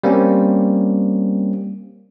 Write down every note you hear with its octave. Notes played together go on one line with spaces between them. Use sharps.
G3 A#3 C4 C#4